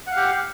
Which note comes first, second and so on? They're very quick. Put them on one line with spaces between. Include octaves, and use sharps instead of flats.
F#5 F5 G4